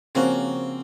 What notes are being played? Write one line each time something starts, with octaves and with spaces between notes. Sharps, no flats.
C#3 F3 A#3 C4 C#4 F#4